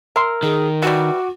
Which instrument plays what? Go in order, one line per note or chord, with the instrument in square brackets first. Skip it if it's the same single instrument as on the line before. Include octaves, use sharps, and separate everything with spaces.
[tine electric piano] A#4 [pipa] E5 C6
[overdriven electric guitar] D#3 [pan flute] G#4
[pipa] E3 G3 [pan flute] F#4 [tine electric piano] F#5 D6